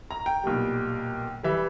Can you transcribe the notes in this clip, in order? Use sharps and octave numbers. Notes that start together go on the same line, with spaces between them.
A#5
G5
B1 A#2 G3
E3 G3 E5